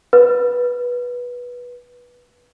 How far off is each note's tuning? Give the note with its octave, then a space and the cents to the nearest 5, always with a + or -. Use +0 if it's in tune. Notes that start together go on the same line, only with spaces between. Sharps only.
B4 -15